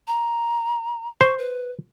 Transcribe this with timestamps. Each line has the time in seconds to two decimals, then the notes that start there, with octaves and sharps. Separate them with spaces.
0.07 A#5
1.21 C5 C#6
1.38 B4